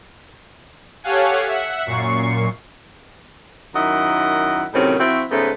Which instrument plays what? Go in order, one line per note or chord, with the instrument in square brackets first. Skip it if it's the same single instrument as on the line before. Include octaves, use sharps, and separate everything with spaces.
[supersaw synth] G4 A4 C#5 F5 F#5 G#5
E5 F#5
F#2 A#2 C#6 C7
[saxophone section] F#2 D#3 E4 D#5 F#5
A2 C3 D#3 F#3 C4 C#4
F3 C4 E4 F#4
G#2 C#3 A3 B3